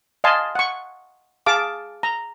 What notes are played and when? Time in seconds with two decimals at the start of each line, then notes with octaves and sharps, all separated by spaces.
0.24 D#5 F5 G#5 A5 C6
0.55 F#5 C#6
1.46 G#4 F5 A5 D6
2.03 A#5